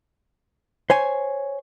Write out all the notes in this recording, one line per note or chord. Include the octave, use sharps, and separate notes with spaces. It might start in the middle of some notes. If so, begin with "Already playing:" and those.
C5 C#5 G#5